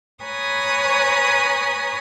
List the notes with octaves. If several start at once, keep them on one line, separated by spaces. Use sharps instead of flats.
B4 C#5 G#5 A#5 D#6